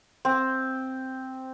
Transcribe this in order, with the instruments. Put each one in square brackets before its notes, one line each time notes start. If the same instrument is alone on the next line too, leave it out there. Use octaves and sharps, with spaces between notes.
[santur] C4